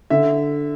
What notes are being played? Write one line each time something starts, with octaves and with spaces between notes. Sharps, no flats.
D3 E5